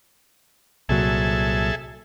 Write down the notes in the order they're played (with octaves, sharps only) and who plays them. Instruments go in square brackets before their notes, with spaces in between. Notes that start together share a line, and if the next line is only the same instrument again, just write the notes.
[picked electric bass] C2 A#2 F#3 [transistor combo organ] G#4 A4 E5